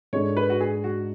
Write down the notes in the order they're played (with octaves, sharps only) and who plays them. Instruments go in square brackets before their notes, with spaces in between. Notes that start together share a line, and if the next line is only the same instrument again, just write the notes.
[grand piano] G#2 G#3 D4 A4 [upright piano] C#5
[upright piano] B4
F#4
G#4
F#4